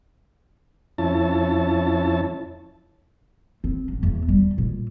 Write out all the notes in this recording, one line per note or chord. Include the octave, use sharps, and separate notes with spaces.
F2 C#4 E4 A5
C4
A1
E2
G3
A#2